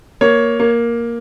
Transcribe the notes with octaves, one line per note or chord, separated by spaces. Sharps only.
A#3 C#5
A#3